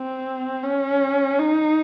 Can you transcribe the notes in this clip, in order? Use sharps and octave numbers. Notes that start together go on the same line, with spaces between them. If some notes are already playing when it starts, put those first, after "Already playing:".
Already playing: C4
C#4
D#4